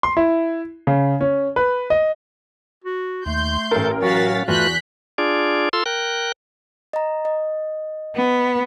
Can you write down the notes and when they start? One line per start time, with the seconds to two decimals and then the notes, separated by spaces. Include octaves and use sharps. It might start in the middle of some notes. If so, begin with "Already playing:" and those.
0.03 C6
0.17 E4
0.87 C#3
1.21 C#4
1.56 B4
1.90 D#5
2.84 F#4
3.26 D#2 A3 C6 G6
3.71 A1 A4 A#4
4.02 F#3 C#4 F#4 F5 A6 B6
4.48 E2 A3 F4 F#4 B4 F#6 G6 B6
5.18 D4 F4 G#4 D5
5.73 F4 A4 C6 E6
5.86 A#4 G5 F#6
6.93 D#5 A#5
7.25 D#5
8.16 B3